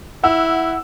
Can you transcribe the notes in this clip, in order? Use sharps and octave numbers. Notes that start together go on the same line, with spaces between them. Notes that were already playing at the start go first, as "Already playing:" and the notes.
E4 F#5 E6